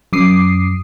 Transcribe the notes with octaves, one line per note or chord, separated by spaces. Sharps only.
F#2 D6 D#6 C7